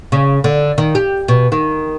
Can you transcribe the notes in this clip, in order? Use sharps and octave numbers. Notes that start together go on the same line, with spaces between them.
C#3
D3
D#3
G4
B2
D#3